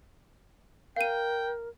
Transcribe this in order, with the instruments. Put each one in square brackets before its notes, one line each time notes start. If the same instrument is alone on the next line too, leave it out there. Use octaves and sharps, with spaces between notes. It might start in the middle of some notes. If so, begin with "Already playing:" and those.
[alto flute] A#4 [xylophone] F5 D#7 [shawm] G5